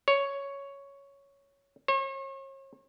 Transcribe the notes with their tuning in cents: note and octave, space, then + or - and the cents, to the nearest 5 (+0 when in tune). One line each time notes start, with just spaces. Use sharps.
C#5 +5
C#5 -40